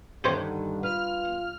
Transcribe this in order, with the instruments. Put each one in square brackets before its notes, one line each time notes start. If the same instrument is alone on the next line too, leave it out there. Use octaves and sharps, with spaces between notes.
[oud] G2 D#3 [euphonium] D3 [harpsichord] G4 C5 C#5
[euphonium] F4 [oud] B4 [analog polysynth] F6